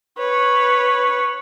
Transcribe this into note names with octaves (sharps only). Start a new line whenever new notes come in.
B4 C#5